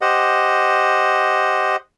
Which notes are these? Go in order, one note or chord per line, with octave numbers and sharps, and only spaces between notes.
G4 C5 D#5 F#5